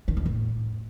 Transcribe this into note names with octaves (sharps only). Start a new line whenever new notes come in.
D#3
F2
A2